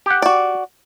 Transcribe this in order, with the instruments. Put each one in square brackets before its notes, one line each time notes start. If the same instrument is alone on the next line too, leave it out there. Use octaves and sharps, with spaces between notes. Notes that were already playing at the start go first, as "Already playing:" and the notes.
[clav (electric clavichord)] G4 F#5
[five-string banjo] F#4 D5